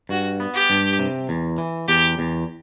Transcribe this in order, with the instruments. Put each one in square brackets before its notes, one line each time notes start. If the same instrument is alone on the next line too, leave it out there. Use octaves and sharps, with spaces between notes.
[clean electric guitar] G2 [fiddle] F#4
[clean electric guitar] B3
[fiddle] G4
[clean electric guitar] G2
C3
E2
E3
[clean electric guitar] E2 [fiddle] G4
[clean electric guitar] E2